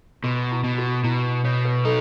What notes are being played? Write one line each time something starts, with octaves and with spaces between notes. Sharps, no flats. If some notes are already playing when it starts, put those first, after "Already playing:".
B2 F#4
E4
B2
F#4
B2 E4
B2 C#5
B4
D#4 A4